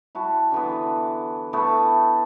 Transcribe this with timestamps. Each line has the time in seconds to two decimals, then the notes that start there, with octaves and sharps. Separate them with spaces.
0.15 E4 F#4 A5
0.52 D3 E3 B3
1.53 A3 B3 E4 A4